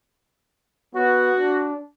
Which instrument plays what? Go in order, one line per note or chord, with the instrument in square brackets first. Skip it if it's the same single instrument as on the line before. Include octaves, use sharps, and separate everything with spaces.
[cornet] B3 [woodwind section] F#4
[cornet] D4